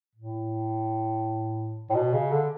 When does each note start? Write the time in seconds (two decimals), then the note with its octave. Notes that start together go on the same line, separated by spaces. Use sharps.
0.15 A2
1.90 A2
1.95 B2
2.13 C#3
2.31 D3